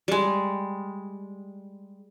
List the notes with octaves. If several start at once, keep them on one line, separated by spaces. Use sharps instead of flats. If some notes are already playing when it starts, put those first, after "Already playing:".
G3 G#3